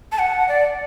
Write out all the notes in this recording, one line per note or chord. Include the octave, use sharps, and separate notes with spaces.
A5
F#5
D5